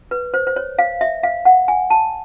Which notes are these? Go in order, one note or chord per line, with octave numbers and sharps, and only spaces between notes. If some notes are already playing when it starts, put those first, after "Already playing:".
B4
C5
C5
C#5
F5
E5
F5
F#5
G#5
A5